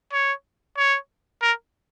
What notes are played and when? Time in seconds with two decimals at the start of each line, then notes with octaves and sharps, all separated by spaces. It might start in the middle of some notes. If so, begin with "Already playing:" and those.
0.13 C#5
0.77 C#5
1.42 A#4